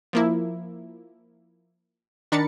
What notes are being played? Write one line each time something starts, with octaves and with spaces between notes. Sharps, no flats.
F3 A#3 E4
D#3 D4 A#4 B5 A6 C#7